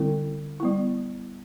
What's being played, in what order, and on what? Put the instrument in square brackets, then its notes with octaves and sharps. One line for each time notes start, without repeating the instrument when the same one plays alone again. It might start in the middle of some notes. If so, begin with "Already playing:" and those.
Already playing: [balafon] D3 G3 C4 E4
G3 B3 E4